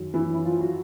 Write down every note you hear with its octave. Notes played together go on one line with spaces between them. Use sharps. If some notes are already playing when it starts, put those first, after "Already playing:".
Already playing: F#2 D#3 F#3
E3 E4
E4
F3 F4
F#3 F#4